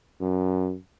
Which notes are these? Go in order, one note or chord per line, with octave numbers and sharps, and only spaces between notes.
F#2